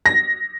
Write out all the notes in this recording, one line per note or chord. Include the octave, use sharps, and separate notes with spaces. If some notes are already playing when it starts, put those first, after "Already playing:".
A#6